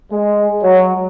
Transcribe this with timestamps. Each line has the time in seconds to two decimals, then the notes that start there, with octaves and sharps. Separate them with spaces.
0.12 G#3
0.63 F#3